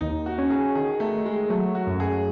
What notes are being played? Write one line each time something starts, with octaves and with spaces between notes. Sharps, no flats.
D#2 D#4
F#4
C#4
G#4
D#3 G#4
A3
D#3
G#3
F#3 A3
F#4
F#2
G#4